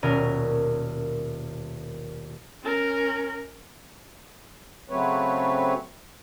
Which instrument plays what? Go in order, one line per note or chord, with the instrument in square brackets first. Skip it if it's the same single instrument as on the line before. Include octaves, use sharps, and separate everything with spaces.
[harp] D#1 B2 C#4 A#4 D#7
[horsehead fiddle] C#4 A#4
[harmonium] C#3 F#3 A3 C4 B4 C#5